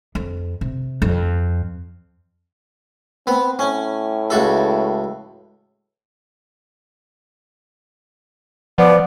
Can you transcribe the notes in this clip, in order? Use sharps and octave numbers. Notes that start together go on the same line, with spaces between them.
F2
C3
F2
B3 C4
A2 C#4
C#2 F#4 A4
F3 B3 D5